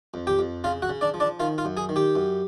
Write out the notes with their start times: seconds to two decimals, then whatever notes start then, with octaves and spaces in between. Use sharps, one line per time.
0.14 F2
0.27 G4 G5
0.39 F2
0.64 C#3 F4 F5
0.82 F#4 F#5
0.89 C#3
1.01 D4 D5
1.14 F3
1.20 D4 D5
1.40 D#3 F4 F5
1.58 F4 F5
1.65 F#2
1.77 G#4 G#5
1.89 D#3
1.96 G4 G5
2.15 F#2